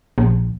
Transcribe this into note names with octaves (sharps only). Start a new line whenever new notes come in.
A#1